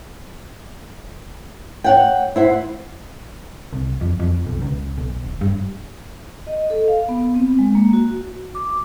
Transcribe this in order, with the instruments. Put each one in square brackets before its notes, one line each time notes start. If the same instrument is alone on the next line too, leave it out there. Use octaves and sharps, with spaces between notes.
[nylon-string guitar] C#5 F#5 G5
E4 C5 F#5
[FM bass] C2
F2
F2
B1
C#2
B1
D#1
G2
[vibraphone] D#5
A4
F5
B3
C4
G#3
A#3
F#4
F#4
D6